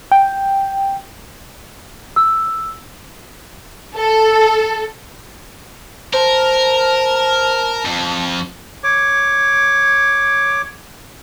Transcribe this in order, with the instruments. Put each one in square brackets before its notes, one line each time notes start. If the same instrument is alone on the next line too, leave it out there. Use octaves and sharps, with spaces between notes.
[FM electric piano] G5
[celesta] E6
[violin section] A4
[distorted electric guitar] A#4 [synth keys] C5 [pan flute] A5
[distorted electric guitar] F2
[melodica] C#5 D6